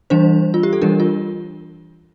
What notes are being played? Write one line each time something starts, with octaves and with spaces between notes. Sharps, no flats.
E3 G3 D4 C5
F4
G4
A4
E3 G3 D4 A#4
F4